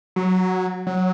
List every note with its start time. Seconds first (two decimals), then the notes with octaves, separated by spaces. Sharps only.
0.16 F#3
0.87 F#3